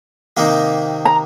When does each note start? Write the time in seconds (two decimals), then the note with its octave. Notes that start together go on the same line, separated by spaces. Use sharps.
0.37 C3 D#3 A#3 D#4 G4
1.05 A#5